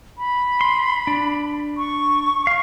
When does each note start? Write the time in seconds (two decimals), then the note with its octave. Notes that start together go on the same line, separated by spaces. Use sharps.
0.18 B5
0.61 C6
1.07 D4
1.77 C#6
2.47 F5